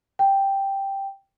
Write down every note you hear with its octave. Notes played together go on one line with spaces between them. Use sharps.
G5